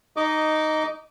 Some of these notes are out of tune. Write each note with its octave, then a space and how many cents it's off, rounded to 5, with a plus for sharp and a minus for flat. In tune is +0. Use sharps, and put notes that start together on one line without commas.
D#4 -5 D#5 +0 D6 -25